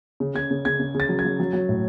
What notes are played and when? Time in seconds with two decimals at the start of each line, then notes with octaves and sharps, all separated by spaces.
0.20 C#3
0.35 C#3 G#6
0.51 C#3
0.65 C#3 G#6
0.80 C#3
0.95 C#3 A6
1.09 F#3
1.19 G#6
1.25 F#3
1.40 F#3
1.53 F#3
1.69 A2